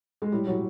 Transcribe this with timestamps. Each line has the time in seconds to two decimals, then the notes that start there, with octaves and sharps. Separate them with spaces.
0.22 G#3
0.32 A2 G3
0.47 A2 F#3